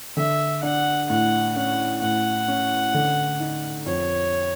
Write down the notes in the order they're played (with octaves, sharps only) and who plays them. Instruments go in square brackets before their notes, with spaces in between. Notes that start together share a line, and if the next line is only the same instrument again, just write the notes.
[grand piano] D3 [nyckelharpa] E5
[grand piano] D4 [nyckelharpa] F#5
[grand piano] A2 [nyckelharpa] F#5
[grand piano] C#4 [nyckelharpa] F#5
[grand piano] A2 [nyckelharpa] F#5
[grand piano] C#4
D3
D#4
[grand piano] F2 [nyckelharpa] C#5